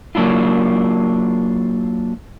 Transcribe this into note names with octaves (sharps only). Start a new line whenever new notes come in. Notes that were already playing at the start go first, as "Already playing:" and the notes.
F#3 A#3 D4 E4 F4